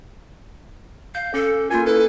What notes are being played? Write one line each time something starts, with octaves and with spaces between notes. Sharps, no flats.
F5 G6
C#4 A4
A#3 F4 A#4 G#5
E4 A4 B4